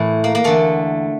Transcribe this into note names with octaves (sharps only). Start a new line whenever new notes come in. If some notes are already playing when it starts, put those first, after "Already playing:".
Already playing: A2 E3 E4
A#3
A#3
E2 D3 A3